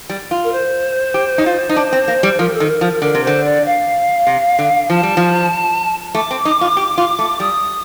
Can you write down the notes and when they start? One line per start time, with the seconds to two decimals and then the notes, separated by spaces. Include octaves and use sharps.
0.10 G3
0.31 F4
0.43 A#4
0.52 C5
1.14 G4
1.38 D#4
1.46 F4
1.69 D#4
1.76 D4
1.93 C4
2.08 A#3
2.23 G3
2.39 F3 A#4
2.53 A4
2.60 D#3
2.67 A#4
2.81 F3
3.02 D3 A#4
3.15 C3
3.23 D3 C5
3.43 D5
3.64 F5
4.27 C3
4.59 D3
4.90 F3 A5
5.03 G3
5.17 F3
6.15 A3 D6
6.31 C4
6.45 D#4
6.61 F4
6.77 G4
6.98 F4
7.19 A3
7.40 G3 D#6